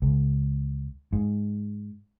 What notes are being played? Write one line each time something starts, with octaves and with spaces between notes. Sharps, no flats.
C#2
G#2